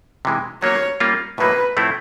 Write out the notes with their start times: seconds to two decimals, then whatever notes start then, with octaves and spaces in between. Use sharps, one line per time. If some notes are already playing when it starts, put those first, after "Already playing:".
0.25 C3 E3 G#3
0.62 F#3 A#3 C#4 F4 C#5
1.00 G3 A#3 C#4 F4
1.38 A2 F#3 A#3 D#4 B4
1.77 A2 F3 A3 C4 E4